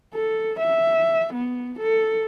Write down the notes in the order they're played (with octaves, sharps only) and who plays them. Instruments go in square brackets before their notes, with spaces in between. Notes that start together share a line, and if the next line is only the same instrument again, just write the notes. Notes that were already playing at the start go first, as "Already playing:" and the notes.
[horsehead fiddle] A4
E5
B3
A4